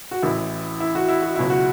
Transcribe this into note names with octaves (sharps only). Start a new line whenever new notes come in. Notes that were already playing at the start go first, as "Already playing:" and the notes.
F#4
A1 A2 E3 E4
E4
F#4
E4
F#4
C#2 B2 F#3 E4
F#4